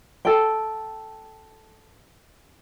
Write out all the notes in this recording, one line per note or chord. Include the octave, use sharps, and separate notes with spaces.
A4 G5